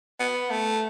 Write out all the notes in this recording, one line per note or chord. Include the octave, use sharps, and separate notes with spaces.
B3
A3